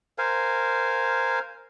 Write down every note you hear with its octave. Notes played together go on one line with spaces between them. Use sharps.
A#4 C5 F5 G#5